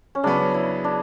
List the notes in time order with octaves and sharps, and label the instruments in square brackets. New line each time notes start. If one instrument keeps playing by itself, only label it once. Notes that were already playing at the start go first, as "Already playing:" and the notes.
[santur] C#4
[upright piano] C#3 F#3 B3 [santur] D4
[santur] E4
D4